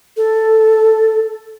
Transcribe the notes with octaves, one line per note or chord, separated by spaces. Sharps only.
A4